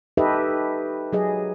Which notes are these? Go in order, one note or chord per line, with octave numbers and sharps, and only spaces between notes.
D#4 G4 A4 B4 D#5 E5
F#3 G#4 D#5